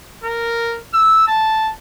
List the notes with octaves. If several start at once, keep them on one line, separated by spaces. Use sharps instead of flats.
A#4
E6
A5